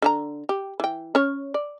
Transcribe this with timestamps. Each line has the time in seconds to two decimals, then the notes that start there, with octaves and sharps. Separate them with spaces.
0.02 D3 F#4 A#5
0.49 G4
0.80 E3 G5
1.15 C#4 C#5
1.54 D5